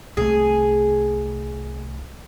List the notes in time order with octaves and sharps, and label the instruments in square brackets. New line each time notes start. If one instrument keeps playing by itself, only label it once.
[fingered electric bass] C2 A3 [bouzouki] G#4